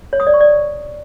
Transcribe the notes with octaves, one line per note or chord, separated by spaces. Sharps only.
C#5
D#6
D5
C#6
D5